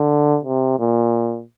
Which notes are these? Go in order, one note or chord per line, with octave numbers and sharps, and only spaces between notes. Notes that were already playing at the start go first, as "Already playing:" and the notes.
Already playing: D3
C3
A#2